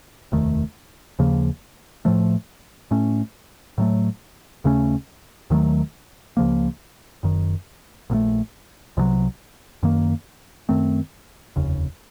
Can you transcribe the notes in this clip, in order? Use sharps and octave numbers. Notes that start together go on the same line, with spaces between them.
F1 D#2 D#3 A3
D#2 C#3 F3 A#3
A2 F3 A3
A2 A3 C#4
A2 F#3 A3
D#2 C#3 A3 C#4
D#2 D#3 F#3 A3
C#2 C#3 F3 A#3
F#1 F#2 D#3
A#1 A#2 A3
C2 C3 D#3 F#3
F#2 D#3 A#3
F#2 D#3 A3 C4
F1 D#2 C#3